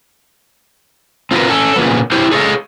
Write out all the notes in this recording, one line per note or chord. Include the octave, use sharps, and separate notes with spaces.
C4 F4 F#4 A#4 B4
C#4 A4
A#2 C#3 F3 A#3 B3
E4 G4 C5 C#5
G#4 A4 C#5 D#5 F5